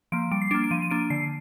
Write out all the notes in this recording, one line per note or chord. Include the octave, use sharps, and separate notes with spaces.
F3 A#3 D7
G3 D7
C7
A#3 D4 D7
D7
F3 D#7
D#7
A#3 D4 D7
D3 C7